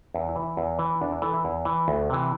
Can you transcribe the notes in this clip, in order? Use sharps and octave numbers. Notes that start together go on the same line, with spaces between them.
E2 E4
E4
E3
E4
E2
E3
E2 D4
E4
E3 A4
E4
E2
E3
D2
C3 E3